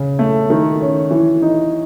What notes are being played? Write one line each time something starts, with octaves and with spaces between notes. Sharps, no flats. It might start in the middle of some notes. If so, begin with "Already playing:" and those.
Already playing: C#3
A3
D#3
C#4
E3
D#4